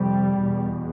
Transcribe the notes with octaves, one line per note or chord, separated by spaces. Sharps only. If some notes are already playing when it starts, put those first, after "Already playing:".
Already playing: F2 C3 G3
E2 B2